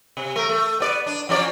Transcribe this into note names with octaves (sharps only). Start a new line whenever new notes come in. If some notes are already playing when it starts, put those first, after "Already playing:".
C3
A3 A#4
A3
B3 D5
D4
F3 C#4 D5